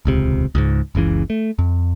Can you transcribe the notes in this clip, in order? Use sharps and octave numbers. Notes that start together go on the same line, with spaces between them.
D#1 C#2 C3
C#2 G#2
F#1 C#2 C#3 E3
A3
F2